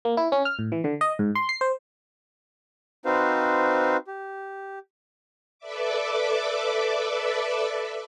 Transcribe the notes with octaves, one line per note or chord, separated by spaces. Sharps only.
A#3
E4
C#4
F6
A2
E3
D3
D#5
G#2
C6
C7
C5
C4 D#4 F#4 B4 C5 F5
G4
A4 B4 D5 E5 D6